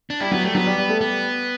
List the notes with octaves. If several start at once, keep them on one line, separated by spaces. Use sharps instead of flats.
D4
G3 E4
F#3 B3
G3 A3
F#3 B3
G3
G3
A3
G3 B3